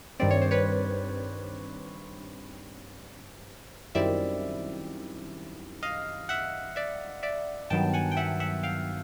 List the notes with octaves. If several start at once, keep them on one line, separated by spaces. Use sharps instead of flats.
G2 D#3 G3 C4 D5
C#5
C5
B4 C#5
F#2 D#3 G3 C4 E4 D5 E5
D#5 F5
E5 F#5
D5 E5
D5 E5
G2 D#3 F#3 B3 G5 A5
F#5 G#5
G5
E5 F#5
E5 F#5
F5 G5